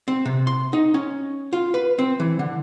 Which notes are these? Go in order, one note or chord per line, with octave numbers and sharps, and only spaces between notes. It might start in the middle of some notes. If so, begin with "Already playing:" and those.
C4
C3
C6
D#4
C#4
F4
B4
C4
E3
D3